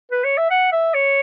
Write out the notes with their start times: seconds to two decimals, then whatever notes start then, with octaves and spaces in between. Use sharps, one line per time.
0.11 B4
0.24 C#5
0.37 E5
0.51 F#5
0.72 E5
0.94 C#5